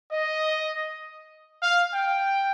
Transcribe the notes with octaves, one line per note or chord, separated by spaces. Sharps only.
D#5
F5
G5